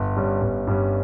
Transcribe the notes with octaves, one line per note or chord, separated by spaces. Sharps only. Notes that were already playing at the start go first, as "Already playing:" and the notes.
Already playing: G1
G2 G3 C#4
G1
G2 G3 C#4